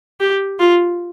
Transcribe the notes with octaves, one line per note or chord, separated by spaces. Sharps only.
G4
F4